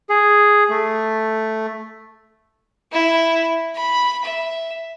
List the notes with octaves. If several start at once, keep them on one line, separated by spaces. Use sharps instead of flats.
G#4
A3
E4
B5
E5